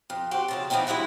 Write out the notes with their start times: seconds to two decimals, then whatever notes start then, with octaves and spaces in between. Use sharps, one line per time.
0.10 F2
0.31 C4 F#4 G4
0.48 F2 C#3 A5
0.70 E3 F3 G#3 B3 C4 D#4
0.87 G2 G#3 E4 F#4 E5